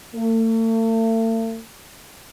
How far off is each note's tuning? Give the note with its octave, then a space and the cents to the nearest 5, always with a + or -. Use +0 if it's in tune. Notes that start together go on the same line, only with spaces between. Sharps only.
A3 +40